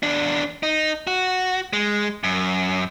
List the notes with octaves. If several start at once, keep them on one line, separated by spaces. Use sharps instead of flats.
E2 D4
D#4
F#4
G#3
F#2